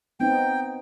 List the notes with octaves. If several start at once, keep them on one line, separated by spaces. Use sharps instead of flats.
B3 C4 D#4 G5